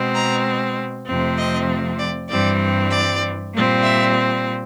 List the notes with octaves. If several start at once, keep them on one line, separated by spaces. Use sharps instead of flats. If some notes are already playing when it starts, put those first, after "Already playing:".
Already playing: B2 G#3 C4
A#5
F2 C3 F3 A3 C4
D#5
D5
G2 E3 G3 C4 D5
D5
A#2 G3 C4
E5